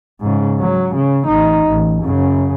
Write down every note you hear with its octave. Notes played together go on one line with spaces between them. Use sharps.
G#2 C#3
F#3
C#3
A1 D#4
A1
F#2 C#3